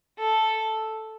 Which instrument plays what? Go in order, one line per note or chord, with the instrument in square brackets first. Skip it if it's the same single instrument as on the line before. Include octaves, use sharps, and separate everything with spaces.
[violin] A4